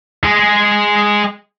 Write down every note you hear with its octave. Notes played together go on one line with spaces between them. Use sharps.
G#3 G#4